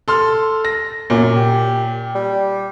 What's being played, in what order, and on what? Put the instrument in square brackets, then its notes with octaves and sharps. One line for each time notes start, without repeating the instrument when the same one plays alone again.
[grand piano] A4 C6 F6
A#6
[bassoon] F#2 [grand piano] A#2
[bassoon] G4
G3